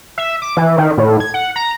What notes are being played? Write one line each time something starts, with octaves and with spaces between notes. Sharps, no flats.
E5
D6
E3
D#3
A2
G#6
F#5
A#5